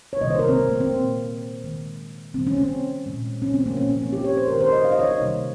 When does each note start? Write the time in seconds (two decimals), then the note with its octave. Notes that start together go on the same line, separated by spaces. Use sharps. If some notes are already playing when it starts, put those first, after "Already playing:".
0.13 C#5
0.21 C3 D#3 G3 A#3 D#5
0.30 C5
0.39 A#4
0.48 C4
0.56 A#3
0.69 C4
0.80 C4
0.92 A#2 G#3 A#3
1.64 D#3 G#3
2.34 D#3 G3 A#3 C4
2.47 C#4
2.58 C4
3.06 A#2 G#3
3.42 C#4
3.54 C4
3.66 A#3
3.77 A#2 F3 A#3 C#4
3.89 A#3
4.02 C4
4.13 G4
4.24 C#5
4.37 C5
4.48 D#3 G#3 A#4
4.61 C5
4.72 D#5
4.85 F5
4.92 D#5
4.99 C#5
5.07 D#5
5.20 C3 D#3 G3 A#3